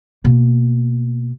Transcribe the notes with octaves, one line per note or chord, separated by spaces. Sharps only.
B2 A#3